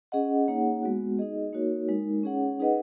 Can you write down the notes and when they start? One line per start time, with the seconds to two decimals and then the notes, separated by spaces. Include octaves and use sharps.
0.12 C#4 G#4 D#5 F#5
0.48 A#3 D#4 G#4 C#5 F#5
0.83 G#3 B3 F#4
1.19 D#4 G#4 D#5
1.53 A#3 D#4 F#4 A#4 C#5
1.89 G#3 D#4 A#4
2.23 C#4 G#4 C#5 F#5
2.60 D#4 G#4 B4 D#5 F#5